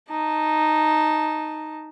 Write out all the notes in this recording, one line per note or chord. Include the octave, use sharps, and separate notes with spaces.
D#4 A5